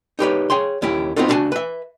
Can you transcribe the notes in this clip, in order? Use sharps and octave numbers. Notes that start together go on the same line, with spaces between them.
D#4 G4 B4 C#5
G#4 C#5 G5 C6
D#2 C#4 E4 G4
B3 C4 D#4 F4 F#4 A4
C#2 D4 E4 F#4 G#5 A5
B4 E5